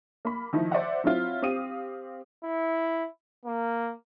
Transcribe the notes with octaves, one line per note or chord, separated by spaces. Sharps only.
A#3 B5
D#3 F3 D#4 E4
C5 D5 E5 F#5
F#3 C4 E4 F4
C4 G4 F5 D#6 D#7
E4
A#3